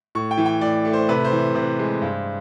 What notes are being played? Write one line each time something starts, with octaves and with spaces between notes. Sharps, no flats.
A2 C#6
G5
E3
G5
A2 D5
A3
C5
C3 B4
C5
E3
C3 C5
G#3
G2